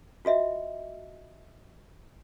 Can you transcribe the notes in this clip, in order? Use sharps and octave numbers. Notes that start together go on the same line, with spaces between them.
F4 F#4 D#5 E5